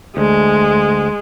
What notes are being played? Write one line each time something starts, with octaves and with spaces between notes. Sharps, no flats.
D2 G#3